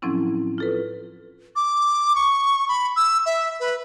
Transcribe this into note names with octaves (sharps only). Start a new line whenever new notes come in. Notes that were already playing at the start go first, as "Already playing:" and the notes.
A2 F3 F#3 C4 C#4 E4
F4 A4 B4
D6
C#6
B5
E6
E5
B4